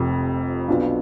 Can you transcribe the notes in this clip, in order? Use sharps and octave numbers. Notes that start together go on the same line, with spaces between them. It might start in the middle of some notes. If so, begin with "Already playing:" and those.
Already playing: F1 F2 C3
B1 B2 B3 D4 F4